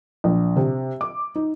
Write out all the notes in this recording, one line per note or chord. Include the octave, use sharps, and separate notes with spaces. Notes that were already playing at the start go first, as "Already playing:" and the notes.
A#1
C3
D6
D#4